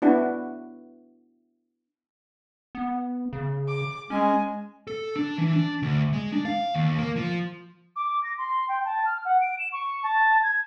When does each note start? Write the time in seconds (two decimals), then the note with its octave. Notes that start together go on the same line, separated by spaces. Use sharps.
0.02 B3 D4 E4 F#4
2.75 B3
3.33 C#3
3.68 D6
4.10 G#3 C#4 G#5
4.87 A4
5.16 D4
5.38 E3
5.53 D4
5.82 D2
6.13 G#3
6.32 D4
6.45 F5
6.74 D#2
6.98 A#3
7.16 F3
7.96 D6
8.24 A#6
8.38 C6
8.69 G5
8.85 A5
9.06 F6
9.25 F#5
9.41 D7
9.59 E7
9.72 C#6
10.03 A5
10.43 G#6